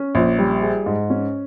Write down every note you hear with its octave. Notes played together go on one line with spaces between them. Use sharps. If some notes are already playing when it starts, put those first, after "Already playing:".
Already playing: C#4
A#1
G3
G#4
G#2
C#4